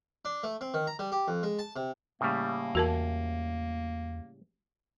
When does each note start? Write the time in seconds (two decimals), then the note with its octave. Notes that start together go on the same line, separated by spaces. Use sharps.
0.25 D4
0.43 A3
0.61 C4
0.74 D#3
0.87 A#5
0.99 G3
1.12 G4
1.28 F2
1.43 G#3
1.59 A5
1.76 C3
2.21 A2 C#3 G3 A#3
2.75 E2 F#4 A#4 A5